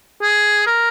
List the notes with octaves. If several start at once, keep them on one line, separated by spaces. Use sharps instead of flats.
G#4
A#4